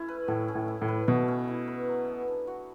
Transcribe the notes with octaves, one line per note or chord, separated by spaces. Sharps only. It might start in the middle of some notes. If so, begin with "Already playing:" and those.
Already playing: A3 C#4 E4
B4
A2 A3
C#4
A2
E4
A2
B4
B2 A3
C#4
E4
B4
F#3
B3
D4
F#4